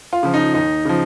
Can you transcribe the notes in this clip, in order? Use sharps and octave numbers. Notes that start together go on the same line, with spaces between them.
F4
C#3 F3
D#4
D#2 D#4
C#3 F3